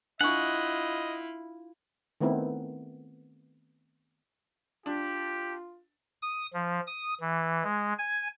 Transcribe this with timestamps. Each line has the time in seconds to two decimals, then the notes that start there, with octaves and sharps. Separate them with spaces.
0.21 D4 E4 F4 D#5 F#5 C#6
2.21 D#3 A3 B3 C4 E4
4.86 D4 F4 G4
6.22 D#6
6.53 F3
6.87 D#6
7.20 E3
7.64 G#3
7.98 G#5